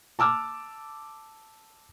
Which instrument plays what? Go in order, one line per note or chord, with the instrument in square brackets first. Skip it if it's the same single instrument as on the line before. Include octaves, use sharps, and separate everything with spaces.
[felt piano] A5 D6 E6 F6